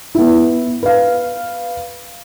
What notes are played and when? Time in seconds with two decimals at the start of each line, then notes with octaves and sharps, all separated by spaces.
0.15 B3 E4
0.83 B4 F5